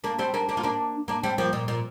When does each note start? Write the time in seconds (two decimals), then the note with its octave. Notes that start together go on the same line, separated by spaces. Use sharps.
0.04 A#3 D4
0.19 G3 C4
0.34 A#3 D4
0.49 A#3 D4
0.57 F4
0.63 A#3 D4
1.08 A#3 D4
1.23 G3 C4
1.38 F3 A#3
1.53 A#2
1.68 A#2